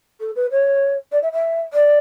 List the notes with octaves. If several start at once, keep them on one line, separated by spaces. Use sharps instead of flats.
A4
B4
C#5
D5
E5
E5
D5